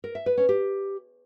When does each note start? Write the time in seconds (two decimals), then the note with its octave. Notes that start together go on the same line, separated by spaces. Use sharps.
0.04 A#4
0.15 E5
0.26 B4
0.37 C#4
0.49 G4